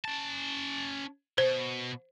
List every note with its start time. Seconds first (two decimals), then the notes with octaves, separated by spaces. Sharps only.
0.05 C#4 A5
1.38 B2 C5